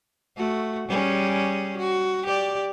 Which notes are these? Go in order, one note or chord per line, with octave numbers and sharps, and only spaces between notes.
A3 F#4
G3 C#4 G#4
F#4
G4 D5